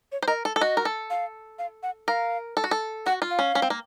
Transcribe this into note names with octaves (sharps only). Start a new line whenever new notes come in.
C#5
C5
A#4 D#5
A4
A4
F#4 D#5
A#4
A4
F5
F5
F#5
A#4 F5
A4
F#4
A4
F#4 F#5
F4
F5
C#4
C#4
C4
A#3